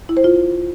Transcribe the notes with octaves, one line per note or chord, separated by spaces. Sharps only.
E4
C5
F4